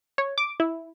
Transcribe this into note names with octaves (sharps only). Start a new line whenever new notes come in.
C#5
D6
E4